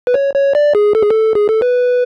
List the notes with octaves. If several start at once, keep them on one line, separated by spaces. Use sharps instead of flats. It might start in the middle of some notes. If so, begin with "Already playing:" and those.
B4
C#5
C#5
D5
G#4
A4
G#4
A4
G#4
A4
B4